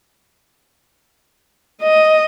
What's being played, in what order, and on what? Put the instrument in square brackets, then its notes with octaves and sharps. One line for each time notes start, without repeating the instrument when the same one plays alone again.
[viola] D#5